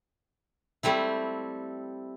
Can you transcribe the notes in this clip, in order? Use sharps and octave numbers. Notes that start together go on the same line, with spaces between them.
G3 A3 C4 E4